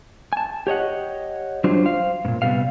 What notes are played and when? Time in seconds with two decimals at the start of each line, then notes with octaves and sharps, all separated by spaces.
0.33 G#5 A5
0.67 G4 C#5 D#5 F#5
1.64 F#3 G3 D4 F4 C5
1.85 C5 F5
2.25 G2 A#2
2.42 C3 D#3 G3 B3 F5